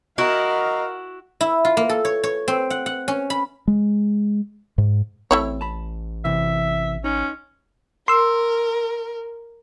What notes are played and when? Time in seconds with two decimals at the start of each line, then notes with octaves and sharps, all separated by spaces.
0.18 E4 F#4 A#4 D#5 F5
1.41 E4
1.65 F4
1.77 A#3
1.89 A4
2.05 C#5
2.23 C#5
2.48 C4
2.70 F#5
2.86 F#5
3.08 C#4
3.30 B5
3.68 G#3
4.78 G#2
5.31 A1 A3 C4 E4 C#5
5.61 A5 B5
6.25 C3 E3 E5
7.04 C#4 D#4
8.08 A#4 C6 E6